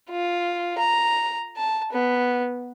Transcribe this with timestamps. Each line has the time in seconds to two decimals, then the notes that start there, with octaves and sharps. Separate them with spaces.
0.10 F4
0.78 A#5
1.57 A5
1.92 B3